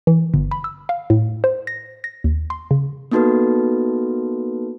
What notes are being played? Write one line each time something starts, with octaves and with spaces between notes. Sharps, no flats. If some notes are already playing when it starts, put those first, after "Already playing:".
E3
G1
B5
E6
F5
A2
C5
A#6
A#6
D#2
C6
C#3
A#3 B3 D#4 F#4 A4 B4